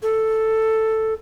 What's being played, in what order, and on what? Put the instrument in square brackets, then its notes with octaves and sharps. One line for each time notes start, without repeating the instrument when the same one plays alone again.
[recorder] A4